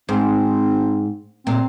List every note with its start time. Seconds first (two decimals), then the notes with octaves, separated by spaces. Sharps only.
0.09 G#2 C4
1.46 A#2 C4